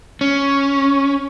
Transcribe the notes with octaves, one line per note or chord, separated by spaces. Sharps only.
C#4